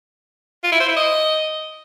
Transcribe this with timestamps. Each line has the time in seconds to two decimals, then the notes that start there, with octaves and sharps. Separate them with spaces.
0.64 F4
0.72 E4
0.80 C5
0.88 E4
0.97 D#5